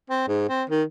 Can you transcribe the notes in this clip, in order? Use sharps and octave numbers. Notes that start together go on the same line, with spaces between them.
C4
G#2
C4
D#3